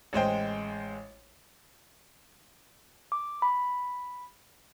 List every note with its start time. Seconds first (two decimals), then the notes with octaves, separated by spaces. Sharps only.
0.13 A1 G#3 C5 G5
3.12 D6
3.42 B5